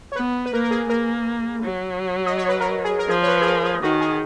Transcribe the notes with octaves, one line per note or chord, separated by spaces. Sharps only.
C#5
B3 B4
B4
A#3 A#4
A#4
G#4
A#3 A#4
F#3
D#5
C#5
B4
A#4
G#4
A#4
F3 G#4
C#5
B4
G#4
A#4
G#4
D#3 F#4
G#4